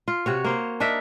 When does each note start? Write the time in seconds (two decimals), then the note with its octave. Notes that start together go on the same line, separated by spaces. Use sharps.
0.08 F4
0.26 C3 F#4 C#5
0.45 A#3 C5 C#5
0.80 D4 D#4 A#4 E5